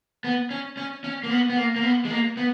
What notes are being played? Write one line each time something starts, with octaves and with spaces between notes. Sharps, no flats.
B3
C#4
C#4
C#4
A#3
B3
B3
A#3
A#3
B3
G#3
A#3
B3